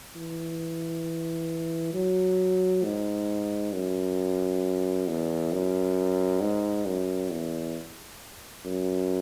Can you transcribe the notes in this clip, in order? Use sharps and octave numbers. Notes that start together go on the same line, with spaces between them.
E3
F#3
G#2
F#2
E2
F#2
G#2
F#2
E2
F#2